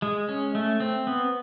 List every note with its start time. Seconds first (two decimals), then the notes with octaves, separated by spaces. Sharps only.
0.02 G#3
0.29 C#4
0.55 A3
0.80 C4
1.07 B3